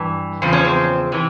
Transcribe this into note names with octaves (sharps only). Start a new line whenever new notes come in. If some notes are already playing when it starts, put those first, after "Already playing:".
Already playing: G2 E3
E2 C#3 F3 C4
C#4
C4
C3 E3